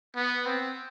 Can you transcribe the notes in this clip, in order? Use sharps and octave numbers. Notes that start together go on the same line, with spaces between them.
B3
C4